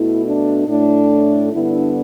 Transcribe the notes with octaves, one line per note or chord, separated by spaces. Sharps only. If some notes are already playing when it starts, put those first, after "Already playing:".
Already playing: B2 A3 E4
D4
A2 A3 D4
G2 D3 B3 D4 E4